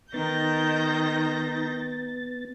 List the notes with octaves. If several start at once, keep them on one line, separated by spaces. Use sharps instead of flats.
D#3 B3 D#4 G6 A6 A#6